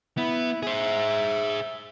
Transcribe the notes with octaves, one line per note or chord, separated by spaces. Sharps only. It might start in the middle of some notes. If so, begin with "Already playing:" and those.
B3 E4
G#4 C5 E5